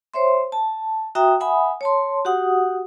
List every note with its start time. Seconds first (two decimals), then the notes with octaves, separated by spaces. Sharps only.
0.14 C5 C#5 E5 C6
0.52 A5
1.15 F#4 E5 G5 A#5 D#6
1.40 E5 F#5 G#5 B5 D#6
1.81 C#5 A5 C6
2.25 F#4 G4 F#5 D#6